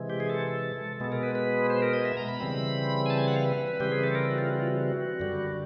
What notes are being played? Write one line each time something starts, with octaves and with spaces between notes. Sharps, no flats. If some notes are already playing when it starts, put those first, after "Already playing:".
Already playing: C3 E3 G#3
G4
G#4
A4
B2 G#3 B3 A4
A#4
B4
B4
C5
A#4
D#5
E5
A#5
B5
C#3 E3 G3 C4
G#5
A5
G#5
F#5
F5
B4
C#3 E3 G3 C4 G4
G#4
A4
A#4
F#4
F4
F#4
F4
F#4
F#2 D3 G3